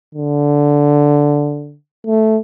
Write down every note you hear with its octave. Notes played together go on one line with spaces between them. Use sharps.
D3
A3